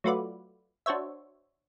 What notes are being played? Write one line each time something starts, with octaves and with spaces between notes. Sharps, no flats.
F#3 A3 F4 F#4 B4 D5
D4 F#4 C5 C#5 E5